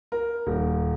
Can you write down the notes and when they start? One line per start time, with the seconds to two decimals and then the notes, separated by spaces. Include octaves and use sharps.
0.12 A#4
0.47 D#1